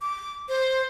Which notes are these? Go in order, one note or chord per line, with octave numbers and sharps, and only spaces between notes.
D6
C5